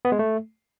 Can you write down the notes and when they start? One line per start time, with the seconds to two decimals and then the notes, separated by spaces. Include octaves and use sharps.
0.05 B3
0.12 G#3
0.19 A3